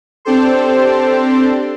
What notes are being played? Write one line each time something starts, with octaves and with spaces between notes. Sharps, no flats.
C4 D4 G4 A4 C5